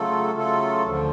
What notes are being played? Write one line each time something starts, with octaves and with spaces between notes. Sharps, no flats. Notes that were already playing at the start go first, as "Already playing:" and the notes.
Already playing: C#3 F#3 A3 F4 A4
C#3 F#3 A3 F4 A4
D2 D3 F3